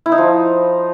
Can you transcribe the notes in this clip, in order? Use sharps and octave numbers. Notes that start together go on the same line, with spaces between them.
E4
D#4
F3